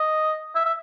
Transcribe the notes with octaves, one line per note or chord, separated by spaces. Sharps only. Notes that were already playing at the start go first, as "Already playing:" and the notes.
Already playing: D#5
E5
E5